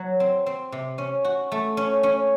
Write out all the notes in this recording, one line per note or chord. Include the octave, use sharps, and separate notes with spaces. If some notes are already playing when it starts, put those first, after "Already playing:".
Already playing: F#3
C4
C4
C3
C#4
F#4
A3
C#4
C#4